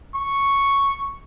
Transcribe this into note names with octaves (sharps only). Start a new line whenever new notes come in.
C#6